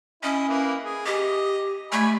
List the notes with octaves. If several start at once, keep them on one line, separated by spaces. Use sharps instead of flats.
C#4 E4 D#5
A#3 E4 B4
G#4
G4 D#5
A3 D5 G#5 B5